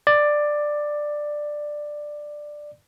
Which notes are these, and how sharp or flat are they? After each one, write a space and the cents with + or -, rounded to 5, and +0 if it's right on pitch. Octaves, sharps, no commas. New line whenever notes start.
D5 +10